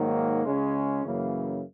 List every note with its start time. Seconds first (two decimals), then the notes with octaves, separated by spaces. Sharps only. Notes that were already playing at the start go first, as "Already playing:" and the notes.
Already playing: G#2 D#3 F#3 A#3
0.45 C#2 C#3 G#3 C#4
1.04 F#2 C#3 E3 A#3